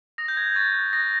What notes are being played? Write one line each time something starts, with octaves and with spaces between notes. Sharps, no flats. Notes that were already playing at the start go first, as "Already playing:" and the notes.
D#6 A#6
G6
F#6 G#6
C#6 A6
F#6
D#6 A#6